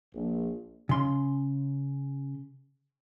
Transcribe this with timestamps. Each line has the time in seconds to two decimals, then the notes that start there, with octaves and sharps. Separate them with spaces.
0.14 A#1
0.89 C#3 C6